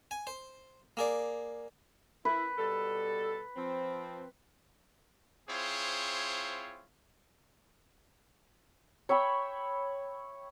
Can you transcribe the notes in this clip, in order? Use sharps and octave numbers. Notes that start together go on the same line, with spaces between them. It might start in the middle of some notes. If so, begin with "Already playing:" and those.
G#5
C5
A#3 G#4 D5
E4 B4
B2 G3 A4
F3 C4
C4 E4 F4 G#4 C5 C#5
C#5 E5 G5 B5